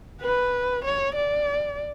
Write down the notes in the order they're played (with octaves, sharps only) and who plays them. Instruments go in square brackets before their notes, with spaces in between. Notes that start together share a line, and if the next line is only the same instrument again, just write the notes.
[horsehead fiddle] B4
C#5
D5